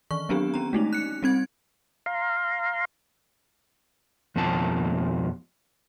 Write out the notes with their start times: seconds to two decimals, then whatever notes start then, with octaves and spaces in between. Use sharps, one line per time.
0.11 D#3 E3 C#6
0.29 F#3 B3 C4 D4 G4
0.54 C#4 A#5
0.73 G#3 A3 D#4
0.93 F#6 C#7
1.22 G3 C4 G#6
2.06 F5 A#5 C6
4.36 F2 B2 D#3 F3 A5